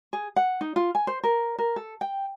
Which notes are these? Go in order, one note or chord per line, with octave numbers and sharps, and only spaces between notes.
G#4
F#5
D#4
F4
G#5
C5
A#4
A#4
A4
G5